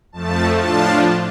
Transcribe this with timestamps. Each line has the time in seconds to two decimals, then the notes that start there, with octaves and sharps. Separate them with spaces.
0.12 F2 F3 A3 A5
0.58 A2 F3 D4 F4 A5